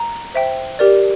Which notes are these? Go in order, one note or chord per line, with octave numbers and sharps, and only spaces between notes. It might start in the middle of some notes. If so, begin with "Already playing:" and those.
Already playing: A#5
C5 E5 G5
G4 A#4 D5